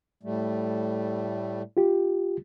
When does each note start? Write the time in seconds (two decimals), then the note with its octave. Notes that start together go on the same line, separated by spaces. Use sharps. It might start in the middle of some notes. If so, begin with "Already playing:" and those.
0.23 A2 G3 A3
1.77 F4 G4